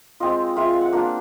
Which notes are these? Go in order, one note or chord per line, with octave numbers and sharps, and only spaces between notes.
G#3 C4 F4 D#5
G#3 C4 F4 E5
F5
F#5
A#3 D4 F4